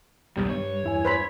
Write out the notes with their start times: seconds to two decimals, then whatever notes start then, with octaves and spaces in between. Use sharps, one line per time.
0.37 B1 E2 C3 D#3 G3
0.50 G2 C#5
0.84 E2 E4 G#5
1.05 B4 C5 B5